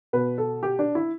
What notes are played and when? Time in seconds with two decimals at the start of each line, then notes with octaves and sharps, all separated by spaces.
0.13 B2 B4
0.38 A4
0.63 G4
0.79 D4
0.95 E4